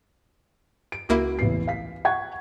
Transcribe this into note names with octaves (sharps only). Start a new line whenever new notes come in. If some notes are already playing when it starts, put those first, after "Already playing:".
D7
C#2 A#3 E4 F#4
A1 E2 C7
F5 B6
F#5 C#6 G#6